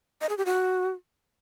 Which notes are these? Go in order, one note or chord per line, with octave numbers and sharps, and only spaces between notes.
D#5
G#4
G4
F#4